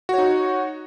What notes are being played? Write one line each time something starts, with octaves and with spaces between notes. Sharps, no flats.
D#4 F#4 C#5